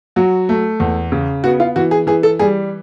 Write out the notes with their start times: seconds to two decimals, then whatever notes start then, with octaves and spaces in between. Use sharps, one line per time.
0.16 F#3 F#4
0.49 A3
0.80 E2
1.12 C#3
1.44 B3 F#4
1.60 F4
1.76 E3 F#4
1.91 G#4
2.07 E3 G#4
2.23 A4
2.39 G3 G#4